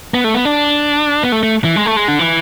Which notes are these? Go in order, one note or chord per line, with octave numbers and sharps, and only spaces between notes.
B3
A3
B3
D4
B3
A3
A3
E3
G#3
A3
G#3
D3
E3